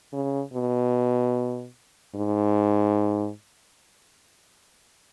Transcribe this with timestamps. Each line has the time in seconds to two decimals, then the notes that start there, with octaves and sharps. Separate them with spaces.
0.13 C#3
0.54 B2
2.16 G#2